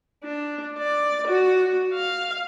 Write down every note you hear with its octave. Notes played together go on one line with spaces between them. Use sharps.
D4
D5
F#4
F5